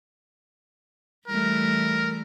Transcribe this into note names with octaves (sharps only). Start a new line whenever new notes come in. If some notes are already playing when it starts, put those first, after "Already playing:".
E3 G3 A3 A#4